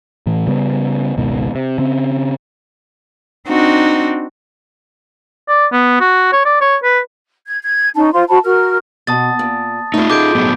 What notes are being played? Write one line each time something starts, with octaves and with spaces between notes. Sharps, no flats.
A2 E3
C#3 G3 B3 C#4
G#1 C#2 B2 D#3
C3
C#3 C4
C4 D4 D#4 F#4
D5
B3
F#4
C#5
D5
C#5
B4
G#6
G#6
C#4 D#4 A5
F4 C5 C6
F#4 C5 A5 B5
F#4 A#4 F6
B2 A5 D#6 A6
A#2
A3 D#4 F4 D5
G#4 A4 D#5 D6 G6 D7
A2 F#3 B3